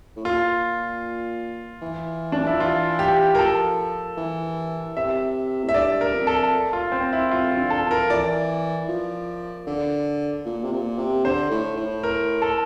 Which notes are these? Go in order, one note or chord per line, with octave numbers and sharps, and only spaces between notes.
A2
A#2 F4
E3
D4
F3 E4
E3 F4
G4
A#4
F3 A4
E3
C3 E5
A2 E5
G2 D5
A#4
F2
A4
F4
C4
E4
F2 F4
F4
D3
A4
F3
A#4
E3 D5
F3
D3
A#2
C3
A#2
C3
D3 C5
A2
A2
A#4
A4